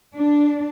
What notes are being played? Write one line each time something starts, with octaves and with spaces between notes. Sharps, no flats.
D4